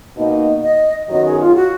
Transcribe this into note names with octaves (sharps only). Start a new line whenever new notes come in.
B2 A#3 D#4
D#5
F#2 D#3 F#3 B3 F#4 D#5
G#4
F4
F#4